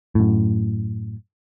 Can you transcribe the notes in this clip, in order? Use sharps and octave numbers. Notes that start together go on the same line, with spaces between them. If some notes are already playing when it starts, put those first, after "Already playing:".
F#2 A2